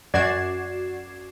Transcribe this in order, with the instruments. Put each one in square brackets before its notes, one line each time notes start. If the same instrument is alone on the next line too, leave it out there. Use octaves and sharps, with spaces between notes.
[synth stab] F#2 F#4 D5 G#6 C7 E7